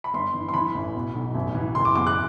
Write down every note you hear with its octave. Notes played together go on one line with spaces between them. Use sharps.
B5
G1 C6
E3
C6
E3 B5
A1
B2
B1
A1
E3
F#1 C6
D6
E2 D6
F#6